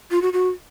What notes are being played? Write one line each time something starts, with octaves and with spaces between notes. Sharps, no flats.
F4
F#4
F#4